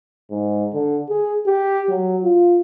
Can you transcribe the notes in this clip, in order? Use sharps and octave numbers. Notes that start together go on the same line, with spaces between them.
G#2
D3
G#4
G4
F#3
F4